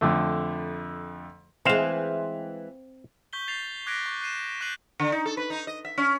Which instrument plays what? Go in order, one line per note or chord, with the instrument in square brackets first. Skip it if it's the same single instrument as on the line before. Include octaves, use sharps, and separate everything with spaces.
[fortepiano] F2 D3 A3
[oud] E3 G#3 [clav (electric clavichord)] C4 C5 F5
[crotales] C#6 G6 B6 G7
A6 C7 F7
D6 F#6 G#6 A#6 B6 D7
C#6
F#6 C7 D#7 E7
C#6 F#6 G6 C7 D#7 F#7
[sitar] D3
D#4
A4
B4
D#4
D#5
E5
C#4